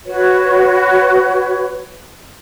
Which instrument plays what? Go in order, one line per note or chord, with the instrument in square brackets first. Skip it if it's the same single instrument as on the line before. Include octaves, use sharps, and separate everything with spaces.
[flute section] F#4 B4 C#5